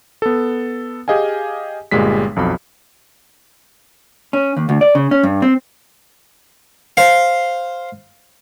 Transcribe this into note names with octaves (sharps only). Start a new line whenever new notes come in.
B3 A4
G4 G#4 D#5 F5 G#5
G1 A#2 G3 G#3 B6
B1 F2 F#4 B5
C#4
D#2
D2
D5
C#3
C#4
G2
C4
C5 F5